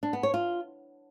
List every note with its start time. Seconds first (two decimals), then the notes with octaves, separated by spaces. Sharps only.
0.03 D4
0.13 B3
0.23 C#5
0.34 F4